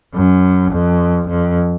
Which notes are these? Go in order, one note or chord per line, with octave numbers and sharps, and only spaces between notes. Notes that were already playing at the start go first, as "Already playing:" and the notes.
F#2
F2
F2